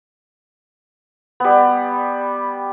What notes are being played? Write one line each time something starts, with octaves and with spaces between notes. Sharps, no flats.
G3 B3